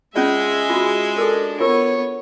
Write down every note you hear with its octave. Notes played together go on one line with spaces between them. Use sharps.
G#3 C#4 F4 D5 E5
F4 F#4
D4 A4 A#4
B3 F4 A#4 C#5